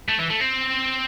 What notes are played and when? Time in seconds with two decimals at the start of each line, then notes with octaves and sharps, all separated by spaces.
0.09 A3
0.19 E3
0.30 A3
0.40 C4